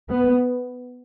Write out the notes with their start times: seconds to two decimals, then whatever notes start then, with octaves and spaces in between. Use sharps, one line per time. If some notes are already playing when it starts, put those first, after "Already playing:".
0.10 B3